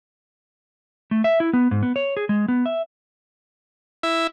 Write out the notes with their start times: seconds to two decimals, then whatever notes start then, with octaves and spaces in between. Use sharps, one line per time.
1.11 A3
1.24 E5
1.40 E4
1.53 B3
1.71 G#2
1.83 B3
1.96 C#5
2.17 G#4
2.29 G#3
2.48 B3
2.66 E5
4.03 E4